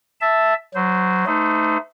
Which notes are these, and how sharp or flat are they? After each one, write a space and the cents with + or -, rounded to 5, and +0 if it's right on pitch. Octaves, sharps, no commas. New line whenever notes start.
E5 +0 A5 +0
F#3 +0 C5 -20
A3 +0 D#4 +0 C5 -40